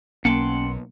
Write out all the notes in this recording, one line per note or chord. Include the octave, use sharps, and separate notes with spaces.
B1 A#3 C#4 F#5 G5 A5 C6